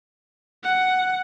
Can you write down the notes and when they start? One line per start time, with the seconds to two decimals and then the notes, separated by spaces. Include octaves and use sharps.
0.64 F#5